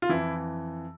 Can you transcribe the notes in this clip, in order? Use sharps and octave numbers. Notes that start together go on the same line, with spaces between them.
F4
F2 E3 E4